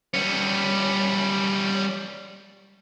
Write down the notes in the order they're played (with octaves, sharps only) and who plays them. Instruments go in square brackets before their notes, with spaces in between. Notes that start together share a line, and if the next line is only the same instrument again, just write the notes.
[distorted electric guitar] G3 C#4